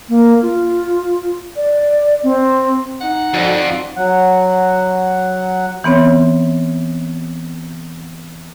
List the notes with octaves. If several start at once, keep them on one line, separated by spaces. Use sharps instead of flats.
A#3
F4
D5
C4
D#4 F#5
F2 F#4 D5
F#3 F#5
E3 B3 C4 C#5